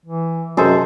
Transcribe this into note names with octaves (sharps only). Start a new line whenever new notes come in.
E3
F#2 C3 D#4 G#4 A4 C5